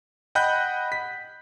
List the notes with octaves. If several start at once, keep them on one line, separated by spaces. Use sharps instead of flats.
D#5 F#5 G5 B5 F#6 G6
B6